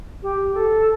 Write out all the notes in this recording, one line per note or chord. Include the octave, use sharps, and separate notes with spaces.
G4
A4